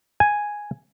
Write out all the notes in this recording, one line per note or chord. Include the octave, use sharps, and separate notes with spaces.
G#5